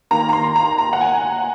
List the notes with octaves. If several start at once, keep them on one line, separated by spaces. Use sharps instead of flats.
D#3 A#3 A#5
A#5
C6
A#5
A#5
F#5
G#5